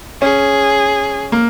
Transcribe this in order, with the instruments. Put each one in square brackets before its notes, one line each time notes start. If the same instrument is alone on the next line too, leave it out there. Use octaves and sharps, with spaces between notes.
[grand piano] C#4 [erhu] G#4
[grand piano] A#3